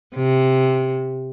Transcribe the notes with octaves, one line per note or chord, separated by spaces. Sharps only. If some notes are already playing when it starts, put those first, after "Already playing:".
C3